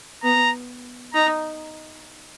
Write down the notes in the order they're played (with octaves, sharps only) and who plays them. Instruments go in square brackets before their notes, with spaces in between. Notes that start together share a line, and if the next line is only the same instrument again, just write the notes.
[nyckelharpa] B3 [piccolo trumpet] A#5
[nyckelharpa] D#4 [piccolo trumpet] A#5